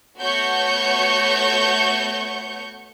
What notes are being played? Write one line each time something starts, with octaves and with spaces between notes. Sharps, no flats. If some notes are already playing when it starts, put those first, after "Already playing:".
A3 B3 F#4 C#5 C#6 G6